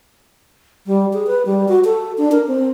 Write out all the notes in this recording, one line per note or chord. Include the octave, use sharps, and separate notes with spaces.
G3
G#4
B4
G3
F#4
A4
D4
A#4
C4